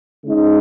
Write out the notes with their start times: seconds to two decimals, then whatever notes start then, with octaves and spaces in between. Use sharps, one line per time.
0.23 C#3 G#3 D#4